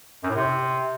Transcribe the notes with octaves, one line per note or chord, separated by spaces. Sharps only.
F#2
A2
C3